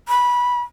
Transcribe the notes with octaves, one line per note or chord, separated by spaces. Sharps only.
B5